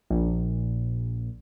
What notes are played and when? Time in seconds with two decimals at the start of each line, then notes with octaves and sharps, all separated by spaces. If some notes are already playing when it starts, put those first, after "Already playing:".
0.11 A#1